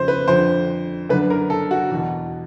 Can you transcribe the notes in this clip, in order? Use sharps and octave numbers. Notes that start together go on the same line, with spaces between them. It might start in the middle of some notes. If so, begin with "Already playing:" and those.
Already playing: F2 C#3 C5
B4
F2 D3 C5
F#2 D3 B4
A#4
A4
F#4
E2 B2